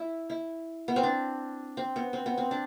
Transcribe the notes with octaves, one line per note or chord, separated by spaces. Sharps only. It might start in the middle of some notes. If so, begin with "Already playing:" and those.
Already playing: E4
E4
B3
C4
D4
C4
B3
C4
B3
C4
D4